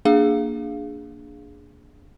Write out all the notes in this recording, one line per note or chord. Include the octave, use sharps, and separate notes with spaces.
A#3 D4 G#4 F5